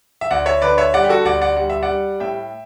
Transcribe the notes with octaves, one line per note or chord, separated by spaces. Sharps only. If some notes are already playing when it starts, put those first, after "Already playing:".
E5
D2 D5 F#5
C#5 E5
D3 B4 D5
C#5 E5
G3 D5 F#5
G4
F#4 A4
D2 D5 F#5
D5 F#5
G3 F#5
E5
D5 F#5
G3
A2 E5 G5